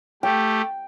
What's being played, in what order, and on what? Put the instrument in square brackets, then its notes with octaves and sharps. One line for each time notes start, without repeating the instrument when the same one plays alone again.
[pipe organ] A3 G4 [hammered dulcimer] G5